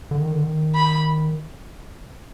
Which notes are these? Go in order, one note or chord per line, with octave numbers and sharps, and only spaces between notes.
D3
D#3
D3
D#3
B5